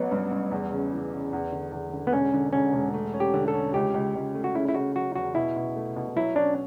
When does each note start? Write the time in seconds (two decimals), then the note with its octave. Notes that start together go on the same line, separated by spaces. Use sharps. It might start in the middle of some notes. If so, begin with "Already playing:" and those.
Already playing: A1 F#3 B3
0.11 G2
0.31 G2
0.51 E2
0.72 C#3
0.93 E3
1.13 C#3
1.33 E2
1.52 D3
1.72 E2
1.93 D3
2.07 B3
2.13 E1 C#4
2.34 D3
2.53 E1 C#4
2.73 E1
2.94 A3
3.14 C#4
3.20 G4
3.34 D3
3.48 A4
3.54 C#4
3.74 C#2 G4
3.94 C#2
4.15 C#2
4.35 A3
4.44 F#4
4.54 C#3 E4
4.69 E4
4.74 C#3 F#4
4.95 F#3 F#4
5.15 E2 F#4
5.35 B2 E4
5.56 B2
5.76 A3
5.96 B2
6.16 F#3 E4
6.36 C#4 D4